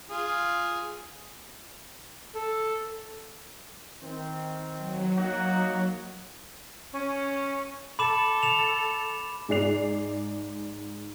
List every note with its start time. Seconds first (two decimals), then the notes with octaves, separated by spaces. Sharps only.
0.10 F4 G#4
2.36 A4
4.02 D#3 C4
4.76 F#3
5.18 A#3 D#4 F#4
6.93 C#4
7.99 A4 B5 D6 E7
8.43 E7 F7
9.49 G#2 G#4 D5 C7 F7